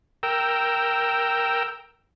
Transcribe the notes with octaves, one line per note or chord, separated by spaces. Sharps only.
A#4 G5 E6